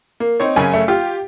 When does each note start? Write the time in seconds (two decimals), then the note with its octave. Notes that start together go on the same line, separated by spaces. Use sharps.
0.20 A#3
0.40 C4 D#4 C#5
0.56 F#2 C#3 G#5
0.73 A3
0.88 F4 G4